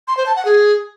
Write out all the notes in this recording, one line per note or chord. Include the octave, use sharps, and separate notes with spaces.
C6
C5
A5
F#5
G#4